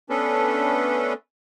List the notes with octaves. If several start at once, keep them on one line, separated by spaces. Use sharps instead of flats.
A3 B3 C#4 D4 A4 B4